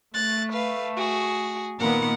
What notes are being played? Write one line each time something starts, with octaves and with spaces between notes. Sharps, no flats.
A3 F#6 A6
B4 F5
F#4 G#4
A#2 D#3 B3 A#4 F#5